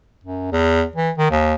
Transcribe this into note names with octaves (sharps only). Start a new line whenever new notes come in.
F#2
E2
E3
D#3
D#2